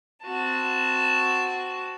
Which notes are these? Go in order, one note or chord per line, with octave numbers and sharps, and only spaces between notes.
C4 F#4 A5